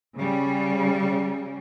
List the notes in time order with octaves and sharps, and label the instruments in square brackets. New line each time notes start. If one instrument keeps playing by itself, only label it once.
[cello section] C#3 G3